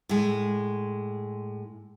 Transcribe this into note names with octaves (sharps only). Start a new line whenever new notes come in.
A2 G#3